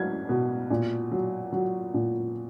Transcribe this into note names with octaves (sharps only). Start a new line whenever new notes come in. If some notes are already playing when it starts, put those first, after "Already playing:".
Already playing: F#3 G#6
B2
A#2
F#3
F#3
A#2